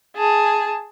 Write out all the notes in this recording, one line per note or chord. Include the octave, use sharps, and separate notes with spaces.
G#4 A5